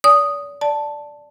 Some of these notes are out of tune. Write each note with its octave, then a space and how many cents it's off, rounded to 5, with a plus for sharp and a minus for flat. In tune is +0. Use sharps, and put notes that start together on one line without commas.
D5 -40 G#5 +0 D#6 +0
D5 +0 A5 +0